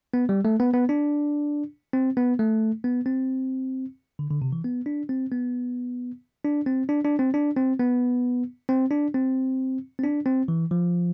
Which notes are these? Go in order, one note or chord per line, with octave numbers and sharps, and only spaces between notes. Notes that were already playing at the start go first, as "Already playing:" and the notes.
B3
G3
A3
B3
B3
D4
C4
B3
A3
B3
C4
D3
D3
C3
E3
B3
D4
C4
B3
D4
C4
D4
D4
C4
D4
C4
B3
C4
D4
C4
C4
D4
C4
E3
F3